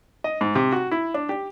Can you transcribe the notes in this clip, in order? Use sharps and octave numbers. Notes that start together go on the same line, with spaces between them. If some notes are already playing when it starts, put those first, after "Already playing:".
D#5
G#2
C3
F#4
E4
D4
G4